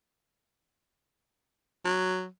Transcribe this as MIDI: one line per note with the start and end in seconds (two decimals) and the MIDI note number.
1.85 2.26 54